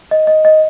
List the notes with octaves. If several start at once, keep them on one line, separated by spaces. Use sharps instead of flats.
D#5
D#5
D#5